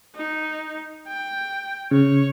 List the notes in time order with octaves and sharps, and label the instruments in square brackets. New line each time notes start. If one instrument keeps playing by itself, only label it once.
[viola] D#4
G5
[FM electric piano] C#3 [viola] C#5